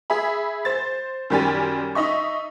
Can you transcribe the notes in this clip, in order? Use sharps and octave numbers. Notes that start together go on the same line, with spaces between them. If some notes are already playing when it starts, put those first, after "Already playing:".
G#4 E5 B5
C5 A6
F#2 D#3 G3 G4 G#5 A6
D#4 D#5 E5 C#6